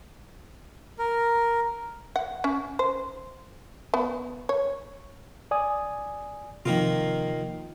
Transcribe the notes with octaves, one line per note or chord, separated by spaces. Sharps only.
A#4
F#5
C#4
C5
B3
C#5
D5 G#5 D#6
C3 D#3 F3 A#3 F4